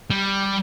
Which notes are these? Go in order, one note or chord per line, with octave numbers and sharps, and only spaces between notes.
G3